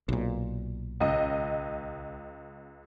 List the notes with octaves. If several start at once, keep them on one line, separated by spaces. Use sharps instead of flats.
B1 A#2
C#2 D#5